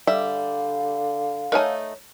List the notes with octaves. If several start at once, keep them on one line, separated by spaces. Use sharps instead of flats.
D3 G3 E5 F5
A3 D#4 A#4 C#5 G#5